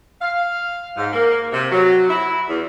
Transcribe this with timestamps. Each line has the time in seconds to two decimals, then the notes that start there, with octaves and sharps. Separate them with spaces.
0.22 F5
0.97 G#2
1.13 A#3
1.52 C3
1.71 F#3
2.09 E4
2.48 E2